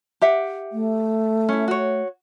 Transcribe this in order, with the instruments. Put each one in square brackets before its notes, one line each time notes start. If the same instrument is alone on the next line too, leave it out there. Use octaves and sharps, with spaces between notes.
[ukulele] G4 E5 F#5
[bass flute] A3
[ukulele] C#4 E4
F#4 C#5